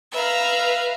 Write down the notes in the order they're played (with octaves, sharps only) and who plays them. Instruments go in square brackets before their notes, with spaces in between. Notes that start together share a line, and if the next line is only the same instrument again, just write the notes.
[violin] B4 F5 [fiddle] E5 A#5